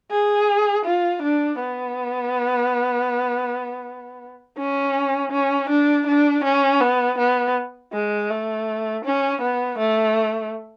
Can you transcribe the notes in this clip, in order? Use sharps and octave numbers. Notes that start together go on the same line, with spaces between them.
G#4
F4
D4
B3
C#4
C#4
D4
D4
C#4
B3
B3
G#3
A3
C#4
B3
A3